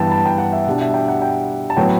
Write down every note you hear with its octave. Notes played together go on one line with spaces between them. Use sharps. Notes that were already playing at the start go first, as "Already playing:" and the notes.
Already playing: G2 E3 B3 G5 A5
A5
G5
F#5
E5
B2 G3 D4
E5
G5
F#5
G5
A5
A2 F#3 B3 G5